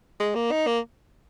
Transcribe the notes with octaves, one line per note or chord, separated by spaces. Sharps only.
G#3
A#3
D#4
A#3